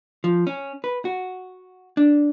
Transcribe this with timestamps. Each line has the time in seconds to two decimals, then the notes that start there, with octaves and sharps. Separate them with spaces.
0.24 F3
0.47 C#4
0.84 B4
1.05 F#4
1.97 D4